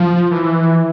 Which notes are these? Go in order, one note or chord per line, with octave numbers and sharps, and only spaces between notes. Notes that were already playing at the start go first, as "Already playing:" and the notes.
Already playing: F3
E3